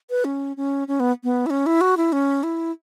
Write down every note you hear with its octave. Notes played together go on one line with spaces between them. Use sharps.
B4
C#4
C#4
C#4
B3
B3
E4
C#4
E4
F#4
E4
C#4
E4